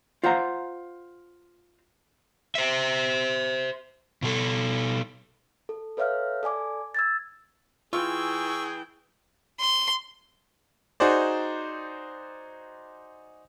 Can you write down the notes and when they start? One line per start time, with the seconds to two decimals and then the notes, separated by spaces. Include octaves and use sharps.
0.23 F4 C5 F5 F#5 A#5
2.55 C5 E5
4.22 B2 A4
5.69 A4
5.97 A4 B4 C#5 E5 F5 F6
6.43 A4 D5 G#5 D6
6.95 E6 G#6 A6
7.93 E3 F4 G#4 G5 C#6 E6
9.60 C6
11.00 D#4 F#4 G#4 C5 D5